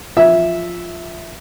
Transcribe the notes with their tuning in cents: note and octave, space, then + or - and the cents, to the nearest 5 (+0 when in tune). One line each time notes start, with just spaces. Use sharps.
F3 +0 E5 -5